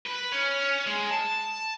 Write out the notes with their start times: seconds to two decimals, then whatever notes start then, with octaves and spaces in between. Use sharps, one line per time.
0.07 B4
0.32 C#4
0.87 G#3
1.11 A5